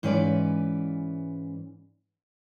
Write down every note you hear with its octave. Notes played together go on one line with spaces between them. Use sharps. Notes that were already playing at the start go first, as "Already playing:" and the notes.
G#2 E3 C#4 B4 D5 G#5